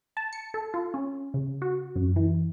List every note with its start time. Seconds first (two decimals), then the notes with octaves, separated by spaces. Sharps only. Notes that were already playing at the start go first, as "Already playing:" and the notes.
0.17 A5
0.33 C#7
0.54 A4
0.74 F4
0.94 C#4
1.34 C#3
1.62 F#4
1.96 F#2
2.16 E3